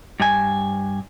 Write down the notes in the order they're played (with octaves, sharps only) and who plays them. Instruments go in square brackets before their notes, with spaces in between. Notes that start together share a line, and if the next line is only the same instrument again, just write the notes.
[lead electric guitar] G2 G#5